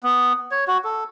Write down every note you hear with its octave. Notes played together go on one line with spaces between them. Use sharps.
B3
C#5
F#4
A4